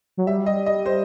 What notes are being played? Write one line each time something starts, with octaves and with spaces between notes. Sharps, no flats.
F#3
G3 E5
D#5
D#5
C5